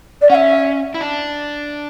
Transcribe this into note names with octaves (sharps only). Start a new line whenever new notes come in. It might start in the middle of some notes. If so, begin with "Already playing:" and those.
D5
C#4 E5 F#5
E4
D4